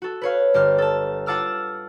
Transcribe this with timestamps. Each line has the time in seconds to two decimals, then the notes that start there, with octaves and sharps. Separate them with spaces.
0.02 F#4 A4
0.22 B4 C#5 F5
0.54 G1 G4 F6
0.78 A4 A5
1.26 F4 F#5 A5 D6 E6 F6